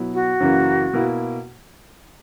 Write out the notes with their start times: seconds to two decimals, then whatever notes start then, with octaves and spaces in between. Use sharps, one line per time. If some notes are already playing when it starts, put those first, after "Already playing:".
Already playing: B2 F#3 B3 E4
0.14 F#4
0.40 F#2 C#3 E3 A#3
0.93 B2 A#3 E4